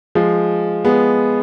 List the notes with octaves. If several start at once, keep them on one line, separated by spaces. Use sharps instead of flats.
F3 G#3
G#3 B3